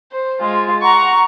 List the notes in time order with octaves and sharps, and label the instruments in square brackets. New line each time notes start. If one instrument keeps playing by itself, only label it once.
[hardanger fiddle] C5
G#3 F4
[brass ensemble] F#5 A#5 [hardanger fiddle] C#6